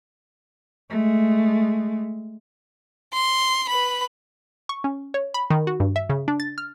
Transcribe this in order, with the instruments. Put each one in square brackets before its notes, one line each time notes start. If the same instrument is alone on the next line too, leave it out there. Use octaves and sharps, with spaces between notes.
[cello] G#3 A3
[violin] C6
B4 B5
[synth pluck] C#6
C#4
C#5
B5
D#3
F#4
G2
E5
C#3
D4
A6
F6